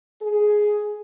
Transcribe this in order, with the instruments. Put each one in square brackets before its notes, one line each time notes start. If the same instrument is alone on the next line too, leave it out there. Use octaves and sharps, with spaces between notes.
[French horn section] G#4